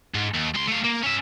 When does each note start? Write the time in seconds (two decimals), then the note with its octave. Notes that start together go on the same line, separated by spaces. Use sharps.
0.14 G#2
0.34 D#2
0.54 C#2 C6
0.68 A3 F5
0.85 A#3
1.04 C#4 E5